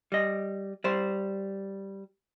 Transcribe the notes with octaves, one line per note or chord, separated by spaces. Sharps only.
G3 D#5
G3 C5